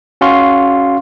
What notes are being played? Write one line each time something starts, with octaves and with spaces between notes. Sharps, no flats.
C#4 F#4 F5 C6 C#6